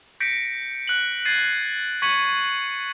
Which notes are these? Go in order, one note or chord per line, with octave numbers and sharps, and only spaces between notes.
G6 A#6 B6 C#7 D7
F#6 F#7
G#6 A6 C7 D#7
C#6 G#6 B6 C#7 D#7 F#7